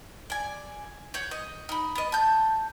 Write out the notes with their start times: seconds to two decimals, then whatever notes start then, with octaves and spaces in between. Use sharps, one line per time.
0.30 D5 G#5
1.14 C#5 F#5 G6
1.31 D#5
1.69 D#4 B5
1.95 B3 D#5
2.12 A5 G6